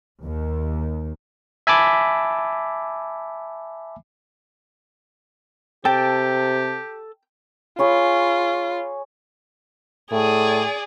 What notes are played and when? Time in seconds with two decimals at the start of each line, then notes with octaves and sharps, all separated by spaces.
0.23 D#2
1.67 E5 G#5 A5 B5 D6
5.85 C3 G4 A4 G5 A5
7.79 F4 G#4 C#5 B5
10.12 A2 G#4 D5